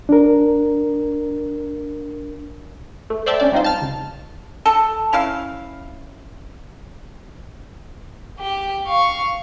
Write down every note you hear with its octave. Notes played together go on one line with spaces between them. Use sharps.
D4 A#4
A3
C5 D5 E5 G5 A5
C#4 D4 D5
G3 C4 D#4 F4 C5
A5 F6
C#2
A4
C#4 E4 F5
G4
F5 C#6